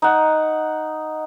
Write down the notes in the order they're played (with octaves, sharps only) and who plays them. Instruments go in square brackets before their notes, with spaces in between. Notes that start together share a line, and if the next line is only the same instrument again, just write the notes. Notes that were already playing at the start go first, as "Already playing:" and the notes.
[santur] D#4 F#5